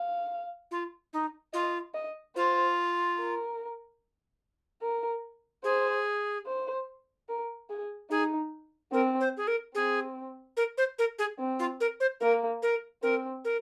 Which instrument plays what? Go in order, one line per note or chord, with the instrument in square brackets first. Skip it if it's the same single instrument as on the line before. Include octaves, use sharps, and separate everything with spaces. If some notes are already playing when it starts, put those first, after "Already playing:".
Already playing: [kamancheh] F5
[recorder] F4
D#4
[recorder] F4 [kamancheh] D#5
[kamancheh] D#5
[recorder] F4 [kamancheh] C5
[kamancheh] A#4
A#4
[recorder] G#4 [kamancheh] C5
[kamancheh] C5
A#4
G#4
[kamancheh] D#4 [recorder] G#4
[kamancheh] C4 [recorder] A#4
[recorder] C5
G#4
A#4
[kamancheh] C4 [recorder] G#4
[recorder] A#4
C5
A#4
G#4
[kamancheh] C4
[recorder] F4
A#4
C5
[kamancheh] A#3 [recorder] A#4
[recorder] A#4
[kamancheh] C4 [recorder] A#4
[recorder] A#4